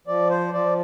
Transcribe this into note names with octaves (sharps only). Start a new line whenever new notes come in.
F3 D5
C5
F3 D5